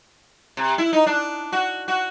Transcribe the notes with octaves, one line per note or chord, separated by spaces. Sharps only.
C3
E4
D#4
D4
F#4
F#4